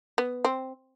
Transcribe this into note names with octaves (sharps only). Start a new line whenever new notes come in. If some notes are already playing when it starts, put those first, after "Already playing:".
B3
C4